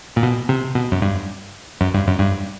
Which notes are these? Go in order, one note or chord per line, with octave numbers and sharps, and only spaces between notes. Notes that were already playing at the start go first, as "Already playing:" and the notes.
A#2
B2
C3
B2
F#2
G2
F#2
G2
F#2
G2